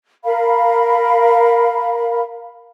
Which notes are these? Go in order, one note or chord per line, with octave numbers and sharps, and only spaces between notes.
A#4 F5 B5